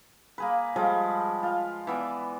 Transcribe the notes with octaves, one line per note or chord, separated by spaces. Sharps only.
A#3 G#4 B4
F3 G3 G#3 B4
F4
E3 B3 D5